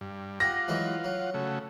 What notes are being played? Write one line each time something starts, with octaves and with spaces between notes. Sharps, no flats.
G2
F4 G4 F#5 A#6
E3 F#3 G#3
F#3
C#3 A3 F#4